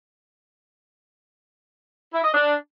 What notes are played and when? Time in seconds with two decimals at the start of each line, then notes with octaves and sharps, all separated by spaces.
2.14 E4
2.24 D#5
2.34 D4